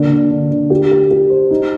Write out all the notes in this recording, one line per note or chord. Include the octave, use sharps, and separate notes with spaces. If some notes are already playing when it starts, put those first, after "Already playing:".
Already playing: D3 A#3
D3
D3
D3
G4
G4
G4
C5
D#4